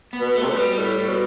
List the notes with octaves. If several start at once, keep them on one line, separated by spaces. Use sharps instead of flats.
B3
B2
A3
C3
B2
G3
A2
A2
B2